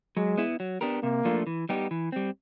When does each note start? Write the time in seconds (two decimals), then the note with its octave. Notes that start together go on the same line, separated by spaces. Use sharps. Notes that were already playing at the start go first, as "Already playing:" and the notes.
0.17 F#3 G#3
0.38 B3 E4
0.60 F#3
0.81 B3 D4 G4 A#4
1.03 C3 A#3
1.25 F3 A3 D4 F4
1.47 E3
1.69 G3 B3 D#4 G4
1.91 E3
2.12 G3 C4